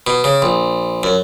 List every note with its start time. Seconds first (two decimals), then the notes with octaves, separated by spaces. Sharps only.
0.07 B2
0.24 C#3
0.42 A#1
1.03 F#2